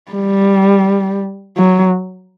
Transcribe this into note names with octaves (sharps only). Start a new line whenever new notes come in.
G3
F#3